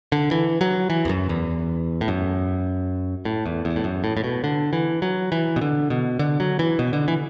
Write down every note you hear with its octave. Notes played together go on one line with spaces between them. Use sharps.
D3
E3
F#3
E3
E2
F#2
E2
A2
F#2
A2
E2
E2
A2
F#2
A2
A2
B2
D3
E3
F#3
E3
B2
D3
B2
D3
F#3
E3
B2
D3
E3